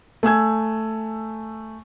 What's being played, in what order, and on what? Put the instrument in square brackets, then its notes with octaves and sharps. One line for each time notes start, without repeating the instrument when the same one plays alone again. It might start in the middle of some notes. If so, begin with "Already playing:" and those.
[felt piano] A3 G#5 E6 G#6